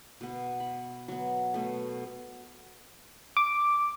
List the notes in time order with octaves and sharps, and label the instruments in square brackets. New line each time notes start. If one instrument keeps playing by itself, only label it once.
[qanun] B2 B3
B5
F#3 B3
B2 A3
[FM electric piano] D6